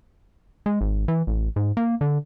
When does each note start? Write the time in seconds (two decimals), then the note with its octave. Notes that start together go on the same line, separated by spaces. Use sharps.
0.66 G#3
0.81 G#1
1.08 E3
1.27 A1
1.56 G#2
1.77 A#3
2.01 D3